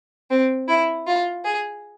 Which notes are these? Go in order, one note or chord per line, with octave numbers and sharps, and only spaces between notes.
C4
E4
F4
G#4